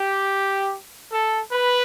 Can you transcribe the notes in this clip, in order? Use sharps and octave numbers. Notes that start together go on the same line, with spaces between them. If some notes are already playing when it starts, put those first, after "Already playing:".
Already playing: G4
A4
B4